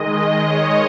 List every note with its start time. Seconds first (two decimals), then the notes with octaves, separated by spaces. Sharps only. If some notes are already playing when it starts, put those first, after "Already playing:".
Already playing: D#3 G#3 D#5
0.13 D#5
0.46 C#5